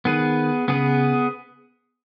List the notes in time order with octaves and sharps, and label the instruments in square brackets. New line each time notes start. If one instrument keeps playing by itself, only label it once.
[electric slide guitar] D#3 [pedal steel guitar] B3 G#4 B4
[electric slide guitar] C#3 [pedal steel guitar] B3 G#4 B4